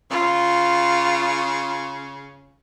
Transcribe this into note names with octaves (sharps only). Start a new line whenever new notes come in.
C#3 F4